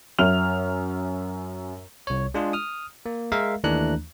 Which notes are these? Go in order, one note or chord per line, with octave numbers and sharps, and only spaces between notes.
F#2 E5 F6 F7
C2 C#5
G#3 D4 F4 G#4
D#6 F6
A#3
G#3 A#4 E5 F5
D#2 E3 A3 D4 A#5 F#6